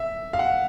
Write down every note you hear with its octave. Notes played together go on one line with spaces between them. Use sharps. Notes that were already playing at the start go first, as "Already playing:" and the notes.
Already playing: E5
F5
F#5